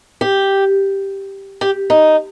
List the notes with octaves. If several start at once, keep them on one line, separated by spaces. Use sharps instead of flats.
G4
G4
D#4